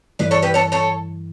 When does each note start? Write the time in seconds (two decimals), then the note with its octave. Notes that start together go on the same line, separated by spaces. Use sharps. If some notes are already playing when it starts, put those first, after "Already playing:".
0.19 G2 E3 A3 E4 B4 D5
0.31 A4 C#5
0.42 G4 B4
0.54 A4 C#5
0.72 A4 C#5